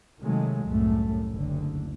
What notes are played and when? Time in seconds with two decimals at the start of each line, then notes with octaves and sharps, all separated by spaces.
0.21 C3 D#3 F#3 G#3 A3
0.66 C2 F#2 A2 A3
1.31 F#1 D2 D3